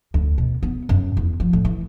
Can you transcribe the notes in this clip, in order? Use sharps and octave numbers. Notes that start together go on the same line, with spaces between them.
D2
B2
B3
F#2
E2
F3
A2
E3